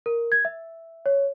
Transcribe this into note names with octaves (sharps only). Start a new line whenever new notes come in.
A#4
G#6
E5
C#5